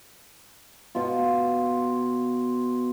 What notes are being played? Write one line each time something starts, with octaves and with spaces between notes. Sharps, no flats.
B2 F4